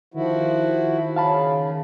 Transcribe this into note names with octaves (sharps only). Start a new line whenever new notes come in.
D#3 F3 E4 F#4
C#3 F5 A5 B5